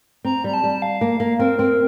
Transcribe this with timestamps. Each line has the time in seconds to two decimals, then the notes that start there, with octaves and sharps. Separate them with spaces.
0.25 C4 A#5
0.44 G3 A#5
0.54 A5
0.64 G3
0.82 F5
1.01 A#3
1.20 A#3
1.39 C4 A#4
1.59 C4